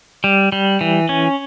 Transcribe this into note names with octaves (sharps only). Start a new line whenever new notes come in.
G3
G3
E3
C#4